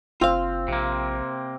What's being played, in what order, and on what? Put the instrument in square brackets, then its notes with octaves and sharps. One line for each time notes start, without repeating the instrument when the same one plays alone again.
[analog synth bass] F#1 [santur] C4 [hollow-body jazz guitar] F4 F5
[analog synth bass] A#1 [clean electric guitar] C3 A#3